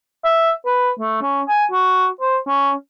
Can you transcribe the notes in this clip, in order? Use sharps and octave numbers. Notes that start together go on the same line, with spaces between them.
E5
B4
A3
C#4
G#5
F#4
C5
C#4